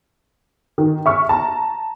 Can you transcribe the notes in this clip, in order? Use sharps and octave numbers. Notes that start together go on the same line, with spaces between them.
D#3
E5 C#6 F6
A5 A#5